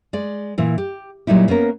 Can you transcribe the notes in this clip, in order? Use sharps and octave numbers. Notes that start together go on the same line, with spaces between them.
G#3 D5
A#2 E3 E4
G4
A#2 F#3 G3 D#4 E4
A#3 B3 C#4 A#4